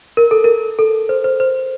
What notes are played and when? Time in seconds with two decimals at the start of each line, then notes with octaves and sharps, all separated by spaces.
0.17 A#4
0.31 A4
0.44 A#4
0.79 A4
1.09 C5
1.24 C5
1.40 C5